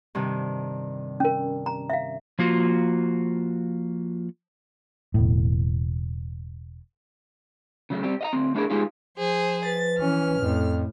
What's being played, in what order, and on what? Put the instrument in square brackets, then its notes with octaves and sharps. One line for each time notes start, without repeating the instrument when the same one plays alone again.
[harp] G2 C3 D#3
[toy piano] C#4 A#4
A#5
E5 F5
[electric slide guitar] F3 A#3 F4 F#4
[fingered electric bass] E1 A2
[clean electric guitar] C#3 F#3 A3
G3 C4 G4
D#5 F5 A#5
D2 C4
A3 D4 E4 G#4 A#4
G#3 D#4 F4 G4 G#4
[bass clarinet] F3 [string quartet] G#4 C5
[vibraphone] B4 [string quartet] A6
[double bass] E3 C#4 [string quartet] F6
[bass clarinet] F2 [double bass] A2